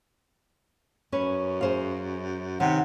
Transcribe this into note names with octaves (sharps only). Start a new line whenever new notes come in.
F#2 C#4 B4 C#5
G#4 C5 F5
C3 D#3 B3 C#4 F#5